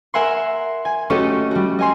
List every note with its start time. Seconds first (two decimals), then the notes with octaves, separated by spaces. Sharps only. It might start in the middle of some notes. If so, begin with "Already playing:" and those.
0.14 A#4 E5 F#5 G#5 C6
0.85 G#5
1.10 A3 C#4 F#4 G4 A4 D#5
1.51 G3 F#4
1.79 D#5 G#5 C6